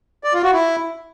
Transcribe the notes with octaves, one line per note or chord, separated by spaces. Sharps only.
D5
F4
F#4
E4